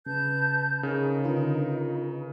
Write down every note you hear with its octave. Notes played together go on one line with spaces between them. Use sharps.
C#3 B4 A5 G6
C#3 D#4 A#4
D3 F4 B4